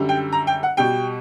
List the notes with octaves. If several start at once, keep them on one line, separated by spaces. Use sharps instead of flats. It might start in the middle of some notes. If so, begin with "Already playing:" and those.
Already playing: F#2 D3 G3
G5
A#5
G5
F#5
B2 G3 G5